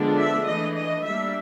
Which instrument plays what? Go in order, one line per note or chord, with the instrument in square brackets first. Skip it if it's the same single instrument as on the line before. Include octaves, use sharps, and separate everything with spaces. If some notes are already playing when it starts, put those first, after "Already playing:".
Already playing: [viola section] D3 F3 G#3 B3 D4
E5
E3 A3 D4 D#5
D#5
G3 A#3 D4 E5